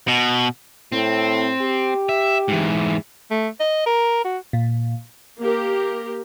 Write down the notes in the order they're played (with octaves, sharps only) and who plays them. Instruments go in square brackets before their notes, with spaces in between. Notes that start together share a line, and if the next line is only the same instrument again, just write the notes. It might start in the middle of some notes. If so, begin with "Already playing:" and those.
[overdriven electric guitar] B2
[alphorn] A2 [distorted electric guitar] C4
[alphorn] G4
[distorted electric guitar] E5
G#2 E3
[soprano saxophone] A3
D#5
A#4
F#4
[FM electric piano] A#2
[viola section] A#3 G4 A#4